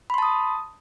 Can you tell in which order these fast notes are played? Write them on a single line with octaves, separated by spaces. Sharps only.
B5 C6 A5 D#6